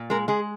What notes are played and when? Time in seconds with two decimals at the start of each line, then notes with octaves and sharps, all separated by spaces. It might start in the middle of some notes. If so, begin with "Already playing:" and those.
Already playing: A#2
0.10 G#3 A#4
0.28 G#3 G#4